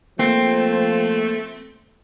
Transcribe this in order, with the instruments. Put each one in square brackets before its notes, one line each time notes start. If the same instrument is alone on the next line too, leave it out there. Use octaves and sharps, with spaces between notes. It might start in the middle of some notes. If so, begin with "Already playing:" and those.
[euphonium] F3 [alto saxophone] A3 [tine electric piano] A#3 [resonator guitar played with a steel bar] C4